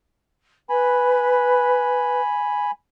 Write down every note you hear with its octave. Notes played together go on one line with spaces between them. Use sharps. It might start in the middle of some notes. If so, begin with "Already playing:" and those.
B4 G#5 B5